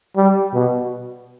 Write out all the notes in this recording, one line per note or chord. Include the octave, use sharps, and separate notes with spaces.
G3
B2